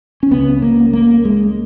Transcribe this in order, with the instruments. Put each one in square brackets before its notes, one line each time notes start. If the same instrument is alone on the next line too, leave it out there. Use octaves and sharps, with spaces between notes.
[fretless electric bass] C#4
C#2 C#3 B3
A#3
A#3
G#3